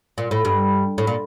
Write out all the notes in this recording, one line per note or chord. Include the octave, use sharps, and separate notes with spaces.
A#2
A2
G2
A2
A#2